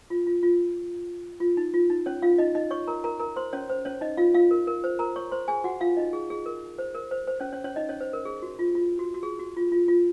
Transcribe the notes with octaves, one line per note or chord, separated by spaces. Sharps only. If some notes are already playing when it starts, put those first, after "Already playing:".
F4
F4
F4
F4
D#4
F4
D#4
C#4 C#5
F4 F5
D#4 D#5
D#4 D#5
C#5 C#6
A#4 A#5
A#4 A#5
A#4 A#5
C5 C6
C#4 C#5
C5
C#4 C#5
D#4 D#5
F4 F5
F4 F5
A#4
A#4
C5
A#4 A#5
C#5 C#6
C5 C6
G#4 G#5
F#4 F#5
F4 F5
D#4 D#5
G#4
G#4
A#4
C5
A#4
C5
C5
C#4 C#5
C#4 C#5
C#4 C#5
D#4 D#5
C#4 C#5
C5
A#4
G#4
F#4
F4
F4
F#4
F#4
G#4
F#4
F4
F4
F4